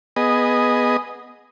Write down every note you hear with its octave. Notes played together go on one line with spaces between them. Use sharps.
B3 G#4 D#5